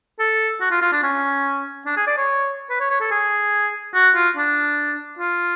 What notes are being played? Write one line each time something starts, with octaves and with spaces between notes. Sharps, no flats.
A4
F#4
F4
F4
D4
C#4
D4
G#4
D5
C#5
B4
C#5
C#5
A4
G#4
F#4
F4
D4
F4